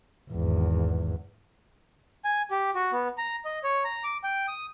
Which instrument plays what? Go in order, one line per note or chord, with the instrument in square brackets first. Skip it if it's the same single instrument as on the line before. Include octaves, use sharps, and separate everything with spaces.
[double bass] G#1 E2
[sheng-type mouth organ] G#5
G4
F#4
B3
A#5
D#5
C#5
A#5
D6
G5
D#6